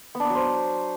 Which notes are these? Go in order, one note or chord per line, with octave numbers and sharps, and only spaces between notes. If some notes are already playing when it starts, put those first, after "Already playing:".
B3
D4
B3
F#3
C5